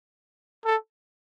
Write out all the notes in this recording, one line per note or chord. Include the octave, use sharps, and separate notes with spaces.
A4